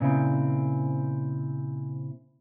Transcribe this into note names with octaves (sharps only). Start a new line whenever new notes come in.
A#2 C#3 C4 E4